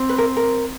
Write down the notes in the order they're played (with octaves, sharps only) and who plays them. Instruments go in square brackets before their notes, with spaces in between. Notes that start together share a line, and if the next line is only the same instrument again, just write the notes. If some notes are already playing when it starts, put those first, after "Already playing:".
Already playing: [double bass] C4
[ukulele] B4
A#4
A#4